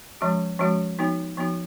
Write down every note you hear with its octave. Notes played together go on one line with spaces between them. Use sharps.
F3 G#3 C#4 F#4
F3 G#3 C#4 F#4
F3 B3 D#4 F#4
F3 B3 D#4 F#4